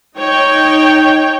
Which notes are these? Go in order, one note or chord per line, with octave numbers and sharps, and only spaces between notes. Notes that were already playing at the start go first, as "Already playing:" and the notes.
D#4 C#5 G5